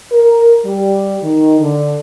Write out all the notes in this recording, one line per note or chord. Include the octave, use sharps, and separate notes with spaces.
A#4
G3
D#3
D3